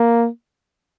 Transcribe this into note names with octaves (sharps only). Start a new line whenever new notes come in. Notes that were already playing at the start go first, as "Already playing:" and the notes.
Already playing: A#3